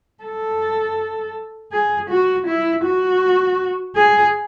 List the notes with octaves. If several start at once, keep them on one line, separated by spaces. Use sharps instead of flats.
A4
G#4
F#4
E4
F#4
G#4